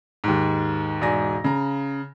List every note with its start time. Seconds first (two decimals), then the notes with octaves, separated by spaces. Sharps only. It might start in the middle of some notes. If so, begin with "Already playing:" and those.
0.24 D#2 G#2
1.01 E1 G#2 D5 G#5 A#6
1.44 C#3 A#5